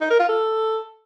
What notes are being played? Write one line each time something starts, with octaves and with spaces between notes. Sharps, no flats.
D#4
A#4
F4
A4